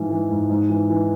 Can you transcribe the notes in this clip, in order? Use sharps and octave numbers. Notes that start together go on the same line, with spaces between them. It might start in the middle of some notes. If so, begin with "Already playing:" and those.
Already playing: G#2 E3 F3
E3
G#2
G#2
E3
E3